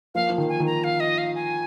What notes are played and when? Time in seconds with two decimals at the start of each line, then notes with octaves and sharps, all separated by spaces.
0.15 F3 A#3 F5
0.30 F3
0.38 D#3
0.49 G#5
0.60 D#3
0.66 A#5
0.84 F5
1.00 D#5
1.18 F5
1.35 G#5